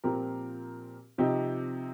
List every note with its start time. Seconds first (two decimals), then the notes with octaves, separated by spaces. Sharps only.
0.04 A#2 F3 C4 G4 A#4
1.18 C3 F3 C4 D#4 G4